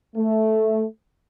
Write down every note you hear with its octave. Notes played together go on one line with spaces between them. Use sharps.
A3